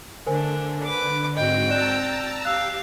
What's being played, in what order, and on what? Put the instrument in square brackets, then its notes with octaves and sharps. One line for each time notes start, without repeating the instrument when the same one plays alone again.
[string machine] D3 [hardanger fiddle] A3 D4 [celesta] A#4 C5 G#5
[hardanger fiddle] B4 D6
[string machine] G#2 F#4 [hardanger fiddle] C4 G5 [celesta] D#5
[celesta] D5 F#6 E7 [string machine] A5 A#5 E6
[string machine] G4 [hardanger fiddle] F5 [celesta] E6 F#6